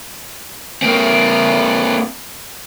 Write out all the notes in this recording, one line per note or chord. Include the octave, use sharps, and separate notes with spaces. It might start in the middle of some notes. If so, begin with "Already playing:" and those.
A#3 C4